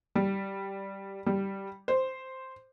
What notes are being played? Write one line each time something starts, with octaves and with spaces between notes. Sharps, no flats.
G3
G3
C5